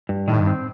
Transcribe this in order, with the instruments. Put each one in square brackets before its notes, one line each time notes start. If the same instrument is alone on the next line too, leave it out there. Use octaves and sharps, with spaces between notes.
[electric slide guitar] G2
[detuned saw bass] A2 [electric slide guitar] D#3
[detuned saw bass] G2
[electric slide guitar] C4